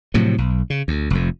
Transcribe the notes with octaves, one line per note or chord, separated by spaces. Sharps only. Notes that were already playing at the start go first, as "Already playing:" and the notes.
A2 C3 F3 F#3
B1
C#3
D2
F1 F2